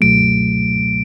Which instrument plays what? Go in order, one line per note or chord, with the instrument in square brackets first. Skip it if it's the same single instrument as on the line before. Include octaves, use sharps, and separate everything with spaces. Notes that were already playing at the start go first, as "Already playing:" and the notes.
[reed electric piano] C#2 B2 F#3 A3 [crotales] D7